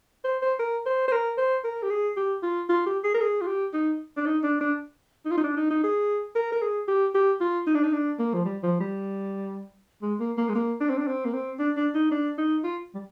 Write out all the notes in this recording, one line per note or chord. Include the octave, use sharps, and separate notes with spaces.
C5
C5
A#4
C5
C5
A#4
C5
A#4
G4
G#4
G4
F4
F4
G4
G#4
A#4
G#4
F4
G4
D#4
D4
D#4
D4
D4
D#4
F4
D#4
D4
D#4
D#4
G#4
A#4
A#4
G#4
G4
G4
F4
D#4
D4
D#4
D4
A#3
F3
G3
F3
G3
G#3
A#3
A#3
G#3
A#3
D4
C4
D4
C4
A#3
C4
D4
D4
D#4
D4
D#4
F4
G3